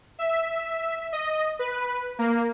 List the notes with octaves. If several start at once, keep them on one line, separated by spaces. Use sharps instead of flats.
E5
D#5
B4
A#3